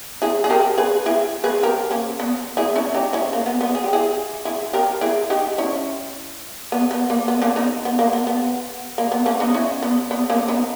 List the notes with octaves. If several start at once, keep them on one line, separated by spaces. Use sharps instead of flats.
E4 G#4
G#4
G4 A#4
G#4 B4
E4 G#4
G#4 B4
G4 A#4
A#3 C#4
B3
E4 G#4
C#4 E4
D#4 G4
C#4 E4
A#3
B3
B3
G#4
G4
E4 G#4
E4 G#4
G4 A#4
E4 G#4
D#4 G4
C#4 E4
B3
B3
A#3
B3
A#3 C#4
B3 D#4
B3
A#3
B3
B3
A#3
B3
A#3 C#4
B3 D#4
C#4 E4
B3
B3
A#3 C#4
B3 D#4